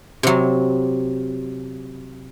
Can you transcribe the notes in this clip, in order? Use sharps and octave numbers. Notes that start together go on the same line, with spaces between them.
C3 F#3